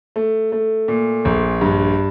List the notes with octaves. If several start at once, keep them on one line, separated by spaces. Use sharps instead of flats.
A3
A3
A#2
A#1
G2